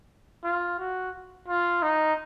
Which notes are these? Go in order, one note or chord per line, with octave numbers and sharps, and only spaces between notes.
F4
F#4
F4
D#4